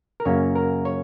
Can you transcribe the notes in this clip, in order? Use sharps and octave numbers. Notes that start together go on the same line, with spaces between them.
A#4
F#2 C#3 A#3 C#4 C#5
A#4
C#5